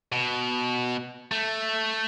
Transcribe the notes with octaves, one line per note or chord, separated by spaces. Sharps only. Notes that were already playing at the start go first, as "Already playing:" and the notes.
B2
A3